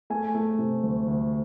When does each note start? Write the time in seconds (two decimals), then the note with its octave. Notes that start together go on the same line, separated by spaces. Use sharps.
0.10 A3 G#5
0.35 A3
0.59 C3
0.83 D2
1.08 D2